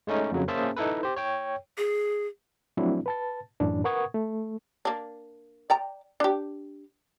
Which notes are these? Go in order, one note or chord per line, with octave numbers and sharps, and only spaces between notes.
G#3 A3 C#4 D#4
F2 C#3 F#3
A#3 C#4 G#4 C5 E5 A5
D#4 E4 A4 B4
G4 C5
C#5 G5
G#4
F3 F#3 A3 C4 D4 E4
B4 A5 A6
F#2 A2 E3 D4
A#4 B4 F#5 C#6 D#6 G#6
A3
A#3 D4
D5 G5 A#5
D4 G4